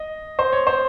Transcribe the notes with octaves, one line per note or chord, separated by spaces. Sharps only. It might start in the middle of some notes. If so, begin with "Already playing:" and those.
Already playing: D#5
C5
C#5
C5